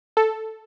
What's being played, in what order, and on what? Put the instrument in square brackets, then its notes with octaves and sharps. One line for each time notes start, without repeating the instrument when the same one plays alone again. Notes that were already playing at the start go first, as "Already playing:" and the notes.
[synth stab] A4